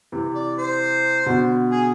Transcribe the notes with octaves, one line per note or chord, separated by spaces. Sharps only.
C3 E3
D5
C5
B2 D3
G#4